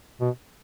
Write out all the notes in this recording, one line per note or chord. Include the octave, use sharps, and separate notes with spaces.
B2